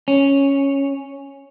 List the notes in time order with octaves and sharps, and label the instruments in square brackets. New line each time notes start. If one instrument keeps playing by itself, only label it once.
[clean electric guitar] C#4